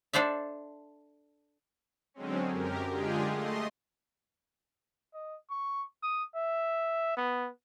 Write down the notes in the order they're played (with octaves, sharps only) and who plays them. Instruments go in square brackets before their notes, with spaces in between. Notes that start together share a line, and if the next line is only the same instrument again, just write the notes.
[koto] D4 A4 C5 D5 E5
[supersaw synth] D3 F#3 G#3 C4 C#4
F#2 G4 A#4
D3 G#3 F4 G4 G#4
A3 D#5 C6
[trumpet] D#5
C#6
D#6
E5
B3